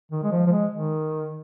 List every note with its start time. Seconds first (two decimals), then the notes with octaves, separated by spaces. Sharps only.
0.12 D#3
0.24 G#3
0.32 F3
0.47 F3
0.52 G#3
0.72 D#3